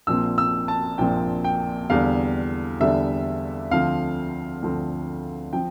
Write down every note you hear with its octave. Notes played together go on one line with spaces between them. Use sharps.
A#1 A#2 F3 C4 E6
E6
A5
A#1 A#2 F3 C4 G5
G5
E2 D3 G3 F5
E2 D3 G3 E5
D2 D3 F3 C4 F5
D2 D3 F3 C4
F3 C4 G5